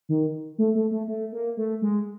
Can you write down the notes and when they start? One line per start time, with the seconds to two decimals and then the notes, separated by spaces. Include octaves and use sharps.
0.09 D#3
0.58 A3
0.75 A3
0.91 A3
1.08 A3
1.32 A#3
1.57 A3
1.82 G#3